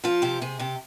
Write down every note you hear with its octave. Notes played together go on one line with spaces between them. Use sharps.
F3 F4
C3 G4
C3 G#4
C3 G4